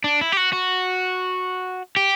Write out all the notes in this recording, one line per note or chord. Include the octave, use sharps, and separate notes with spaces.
D4
E4
G4
F#4
F#4
G4